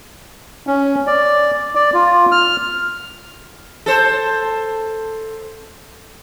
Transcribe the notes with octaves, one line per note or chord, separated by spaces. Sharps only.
C#4
D5
D5
F4
F6
A4 C5